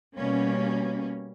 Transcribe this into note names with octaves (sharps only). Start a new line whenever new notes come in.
B2 G3 A#3 C#4